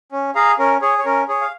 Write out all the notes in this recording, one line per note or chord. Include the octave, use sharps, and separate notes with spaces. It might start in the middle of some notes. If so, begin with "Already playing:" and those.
C#4
G#4 F5 A#5
C#4 A#4
G#4 C#5
C#5
C#4 A#4
G#4 C#5
F5